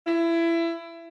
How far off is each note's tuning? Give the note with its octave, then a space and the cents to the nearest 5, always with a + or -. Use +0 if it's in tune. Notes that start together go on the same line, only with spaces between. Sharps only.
E4 +20